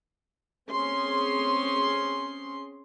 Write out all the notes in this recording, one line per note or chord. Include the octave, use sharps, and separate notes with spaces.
C4 C#4 G#4 C6